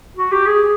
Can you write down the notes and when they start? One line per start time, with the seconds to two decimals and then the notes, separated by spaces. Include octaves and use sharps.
0.17 F#4
0.32 G4
0.47 G#4